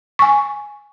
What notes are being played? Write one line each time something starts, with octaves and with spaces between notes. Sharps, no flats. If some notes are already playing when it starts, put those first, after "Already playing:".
G#5 C#6